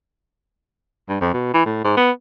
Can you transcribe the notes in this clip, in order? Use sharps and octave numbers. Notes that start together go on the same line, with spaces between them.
G2
F2
B2
E3
A2
G#2
B3